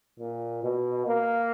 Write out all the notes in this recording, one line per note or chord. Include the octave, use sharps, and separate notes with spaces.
A#2
B2
A#3